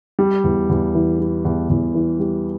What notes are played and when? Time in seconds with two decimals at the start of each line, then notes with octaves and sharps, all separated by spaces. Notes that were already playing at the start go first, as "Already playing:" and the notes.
0.19 G3
0.44 E2
0.69 E2
0.95 E3
1.19 G3
1.45 E2
1.69 E2
1.95 E3
2.20 G3